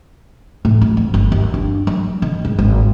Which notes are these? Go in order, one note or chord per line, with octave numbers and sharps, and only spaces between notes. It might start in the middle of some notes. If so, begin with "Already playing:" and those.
A2
F#3
F2
G1
D#2
D4
F#3
D#3
G#2
G#1